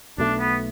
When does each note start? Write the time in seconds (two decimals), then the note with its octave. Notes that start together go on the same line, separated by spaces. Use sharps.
0.18 B1 B2 A3 D4
0.40 B3